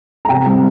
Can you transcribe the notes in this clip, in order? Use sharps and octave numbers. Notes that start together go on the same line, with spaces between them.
A#5
C3 G5
G3 C4